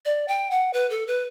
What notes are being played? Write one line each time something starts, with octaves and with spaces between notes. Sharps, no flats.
D5
G5
F#5
B4
A4
B4